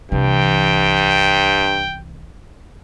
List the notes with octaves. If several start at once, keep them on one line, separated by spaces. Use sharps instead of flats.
C2 G2 E3 G5